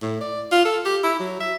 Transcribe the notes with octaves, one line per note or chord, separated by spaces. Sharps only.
A2
D5
F4
A4
G4
E4
F#3
E5